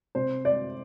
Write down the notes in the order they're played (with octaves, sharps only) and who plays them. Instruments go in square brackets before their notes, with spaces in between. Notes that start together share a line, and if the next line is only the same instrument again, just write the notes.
[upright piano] C3 C5
D5